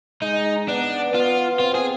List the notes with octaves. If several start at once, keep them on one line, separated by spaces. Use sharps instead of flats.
G#3 D#4
B3 D4
B3 F4
C4 F4
G#4